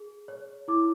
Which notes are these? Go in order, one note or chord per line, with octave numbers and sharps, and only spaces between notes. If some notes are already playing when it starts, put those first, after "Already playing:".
Already playing: G#4
C#5
E4 D6